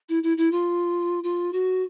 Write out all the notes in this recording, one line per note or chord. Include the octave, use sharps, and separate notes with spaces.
E4
E4
E4
F4
F4
F#4